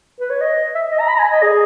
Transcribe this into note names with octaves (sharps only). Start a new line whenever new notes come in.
B4
C#5
D#5
E5
D#5
A#5
B5
A#5
G#5
D#5
G#4